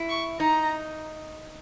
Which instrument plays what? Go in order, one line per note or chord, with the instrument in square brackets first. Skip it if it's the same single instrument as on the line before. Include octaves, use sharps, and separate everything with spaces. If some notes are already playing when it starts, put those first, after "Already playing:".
Already playing: [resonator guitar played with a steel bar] E4
[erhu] C#6
[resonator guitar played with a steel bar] D#4 [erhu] A#5